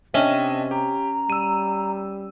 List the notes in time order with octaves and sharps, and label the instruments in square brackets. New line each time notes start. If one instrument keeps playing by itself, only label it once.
[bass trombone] C3 [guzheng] C#4 [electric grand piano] D4 D#5 E5 [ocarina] G5
[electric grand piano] G4 [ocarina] A#5
[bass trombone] G3 [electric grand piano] E6 D#7